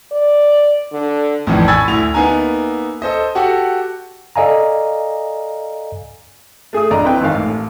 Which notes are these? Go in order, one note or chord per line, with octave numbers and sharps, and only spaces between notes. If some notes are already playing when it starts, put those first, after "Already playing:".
D5
D3
A#1 F2 A2 D#3 E3
G#5 B5 C#6 E6 G#6 A6
D2 E4 F7
A#3 B3 D#4 E5 G#5 A#5
A4 C5 D#5
F#4 G4 A4 F#5
A4 D5 D#5 F5 G#5 A#5
A3 G#4 E5 D#6
A#1 D3 D5 D#5 A#5
C4 E4 B4 G5
D#2 G#2 D#3 D#4 A#4 F5
A1